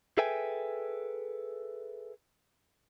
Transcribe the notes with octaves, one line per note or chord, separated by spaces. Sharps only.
G#4 A4 B4 E5 G5 G#5